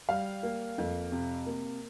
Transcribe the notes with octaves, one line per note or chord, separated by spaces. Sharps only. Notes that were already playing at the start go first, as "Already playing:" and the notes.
G3 F5
A#3
F2
C3
A#3